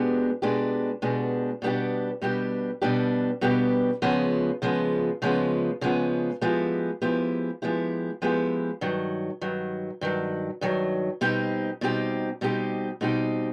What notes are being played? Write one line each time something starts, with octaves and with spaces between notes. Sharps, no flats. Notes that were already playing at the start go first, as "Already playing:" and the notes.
Already playing: B2 G#3 B3 D4 G4
B2 G#3 B3 D4 G4
B2 G#3 B3 D4 G4
B2 G3 B3 D4 G4
B2 G3 B3 D4 G4
B2 G3 B3 D4 G4
B2 G3 B3 D4 G4
C#3 F3 G#3 B3
C#3 F3 G#3 B3
C#3 F3 G#3 B3
C#3 F3 G#3 B3
F3 G#3 B3 E4 G4
F3 G#3 B3 E4 G4
F3 G#3 B3 E4 G4
F3 G#3 B3 E4 G4
G2 D#3 F#3
G2 D#3 F#3
G2 D#3 F#3
G2 D#3 F#3
B2 G3 C4 D#4 G4
B2 G3 C4 D#4 G4
B2 G3 C4 D#4 G4
B2 G3 C4 D#4 G4